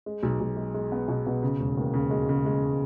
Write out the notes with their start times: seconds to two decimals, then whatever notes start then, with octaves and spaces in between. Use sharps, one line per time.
0.06 G#3
0.23 B1
0.40 B1
0.57 G#3
0.74 G#3
0.92 B3
1.08 B2
1.26 B2
1.43 C#3
1.59 E1
1.77 D#2
1.94 C#3
2.11 G#3
2.29 C#3
2.46 G#3